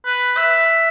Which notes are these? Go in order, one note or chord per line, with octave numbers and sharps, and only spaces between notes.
B4
E5